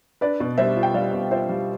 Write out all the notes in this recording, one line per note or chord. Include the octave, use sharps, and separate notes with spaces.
D4 B4 D5
B2
G3 C5 E5
F4
G5
G3 D5 F5
B2
F4 C5 E5
G3